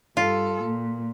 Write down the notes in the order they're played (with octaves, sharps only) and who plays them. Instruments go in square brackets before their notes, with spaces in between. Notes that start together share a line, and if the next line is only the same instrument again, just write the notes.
[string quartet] G2 A4 [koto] F4
[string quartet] A#2